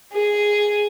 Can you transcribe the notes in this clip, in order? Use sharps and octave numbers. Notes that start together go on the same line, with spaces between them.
G#4